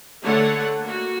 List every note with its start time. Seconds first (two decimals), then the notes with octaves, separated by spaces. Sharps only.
0.23 D3 A3 C#5 F#5
0.82 A#3 F#4